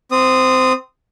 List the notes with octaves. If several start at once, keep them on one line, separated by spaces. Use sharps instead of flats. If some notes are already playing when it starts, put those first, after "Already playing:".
C4 D#6